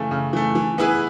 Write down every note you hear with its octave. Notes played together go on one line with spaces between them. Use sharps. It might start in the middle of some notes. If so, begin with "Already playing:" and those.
Already playing: C#3 E3 A3
C#3
E3 A3
E3
B3 E4 G#4 B4